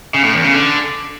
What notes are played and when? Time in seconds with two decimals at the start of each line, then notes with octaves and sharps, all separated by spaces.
0.14 C#3
0.24 A2
0.34 E2
0.44 C#3
0.54 D3